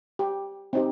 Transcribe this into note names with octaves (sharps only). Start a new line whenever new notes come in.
G4
C4 D#4 G4